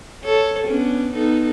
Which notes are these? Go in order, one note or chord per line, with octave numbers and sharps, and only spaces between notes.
A4 C#5
B3 C#4 D4
B3 D#4 A4